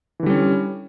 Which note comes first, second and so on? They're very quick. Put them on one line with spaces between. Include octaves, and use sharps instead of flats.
E3 D3 G3 C#4